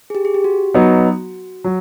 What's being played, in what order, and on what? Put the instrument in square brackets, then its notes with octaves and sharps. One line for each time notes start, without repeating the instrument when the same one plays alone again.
[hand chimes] G#4
G4
G#4
G4
F#4
[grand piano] F#3 B3 D#4
F#3